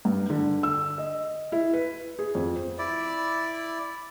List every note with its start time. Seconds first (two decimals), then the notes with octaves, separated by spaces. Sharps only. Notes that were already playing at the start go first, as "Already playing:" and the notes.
0.05 G2
0.30 D3
0.63 E6
0.98 D#5
1.52 E4
1.73 B4
2.19 G#4
2.35 F2
2.78 E4 D5